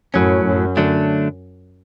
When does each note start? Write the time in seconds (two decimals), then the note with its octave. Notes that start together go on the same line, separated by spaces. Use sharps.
0.14 F#2 A2 F#3 C#4
0.45 F#2
0.77 D3 F#3 A3 D4